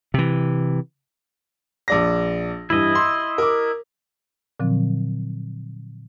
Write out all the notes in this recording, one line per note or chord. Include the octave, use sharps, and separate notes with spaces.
C3 E3
A#1 D5 A#6
G2 E3 E4 D#5
C6
A#4 D6
A#2 D3 F3 F#3 C4